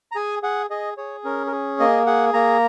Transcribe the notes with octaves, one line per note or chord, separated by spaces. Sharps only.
A#5
G#4 G#5
G#4 F#5
G#4 D#5
G#4 C#5
C#4 A#4
A#4
G#4
A#3 D#5
G#4 F#5
A#3 A#5